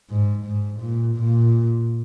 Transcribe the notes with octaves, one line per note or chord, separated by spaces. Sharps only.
G#2
G#2
A#2
A#2